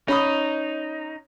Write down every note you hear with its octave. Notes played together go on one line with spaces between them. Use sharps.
C#4 D#4 B5 D#6